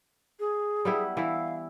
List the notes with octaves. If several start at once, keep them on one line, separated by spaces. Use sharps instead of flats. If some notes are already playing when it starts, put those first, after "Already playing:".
G#4
G3 B3 E4
E3 E4 F5